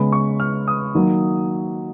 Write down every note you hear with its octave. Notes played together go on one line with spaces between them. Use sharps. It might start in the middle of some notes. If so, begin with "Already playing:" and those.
Already playing: C#3 G#3 B3 B5
C#6
F6
D#6
D#3 F#3 A#3